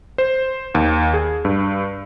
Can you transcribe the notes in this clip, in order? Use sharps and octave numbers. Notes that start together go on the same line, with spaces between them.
C5
D#2
G#4
G2